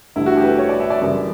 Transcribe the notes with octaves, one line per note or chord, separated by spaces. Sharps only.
A1 G2 D3 E4
F#4
G4
B4
A4
C#5
D5
E5
D5
F#2 C#3 E3 G3